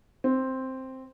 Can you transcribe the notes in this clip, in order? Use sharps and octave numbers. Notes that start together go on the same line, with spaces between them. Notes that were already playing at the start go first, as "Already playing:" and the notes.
C4